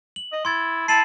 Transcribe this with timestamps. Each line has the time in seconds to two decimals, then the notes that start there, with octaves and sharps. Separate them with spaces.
0.16 F#7
0.32 D#5
0.45 E4 C6 G#6 A6
0.88 E4 A5 C7 D#7 F#7